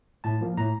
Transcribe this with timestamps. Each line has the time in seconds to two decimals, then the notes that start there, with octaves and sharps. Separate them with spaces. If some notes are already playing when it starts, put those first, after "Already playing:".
0.24 A2 A5
0.41 F3 A#3
0.57 A2 A#5